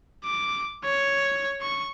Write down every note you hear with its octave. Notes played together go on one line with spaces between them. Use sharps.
D6
C#5
C#6